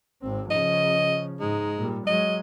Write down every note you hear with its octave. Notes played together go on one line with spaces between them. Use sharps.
G#1 C4
C#3 F3 D#5
G#2 G#3 D#4
A#2 G3
F#3 G#3 D#5